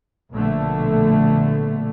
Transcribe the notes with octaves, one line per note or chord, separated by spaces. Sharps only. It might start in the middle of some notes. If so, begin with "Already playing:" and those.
A#1 B2 D3 A3